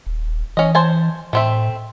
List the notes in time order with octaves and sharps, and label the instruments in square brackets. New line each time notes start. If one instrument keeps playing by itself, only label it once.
[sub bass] D#1
[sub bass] E3 [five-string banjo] C#4 D#5
[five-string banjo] C5 G#5 A5
[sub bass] A2 [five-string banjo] A3 C4 E5